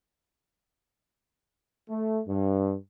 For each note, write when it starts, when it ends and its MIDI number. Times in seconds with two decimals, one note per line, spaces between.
1.88 2.20 57
2.26 2.73 43